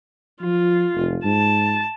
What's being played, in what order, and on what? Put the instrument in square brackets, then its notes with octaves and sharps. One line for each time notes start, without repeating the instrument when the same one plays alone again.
[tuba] F3 [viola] F4
[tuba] F1
[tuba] G#2 [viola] A5